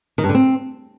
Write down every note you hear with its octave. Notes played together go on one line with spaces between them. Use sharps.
D#3
G2
D3
C4